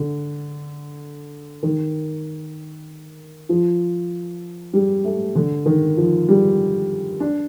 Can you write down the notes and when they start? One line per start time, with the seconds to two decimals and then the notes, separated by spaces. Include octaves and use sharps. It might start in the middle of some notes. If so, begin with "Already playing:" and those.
Already playing: D3
1.63 D#3
3.49 F3
4.73 G3
5.04 A3
5.35 D3
5.66 D#3
5.97 F3
6.29 G3
7.20 D4